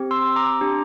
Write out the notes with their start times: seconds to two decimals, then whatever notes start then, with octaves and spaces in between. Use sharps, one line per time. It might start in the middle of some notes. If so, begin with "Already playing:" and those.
Already playing: C4 G4
0.11 C6 E6
0.36 A#5 D6
0.61 D4 G4